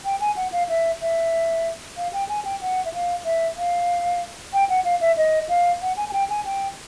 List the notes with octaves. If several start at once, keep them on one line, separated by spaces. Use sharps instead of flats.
G5
G#5
F#5
F5
E5
E5
F5
G5
G#5
G5
F#5
E5
F5
E5
F5
G5
F#5
F5
E5
D#5
F5
F#5
G#5
G#5
G5
G#5
G5